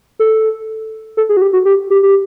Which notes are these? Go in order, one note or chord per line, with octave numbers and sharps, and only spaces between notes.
A4
A4
G#4
F#4
G4
F#4
G4
G4
G4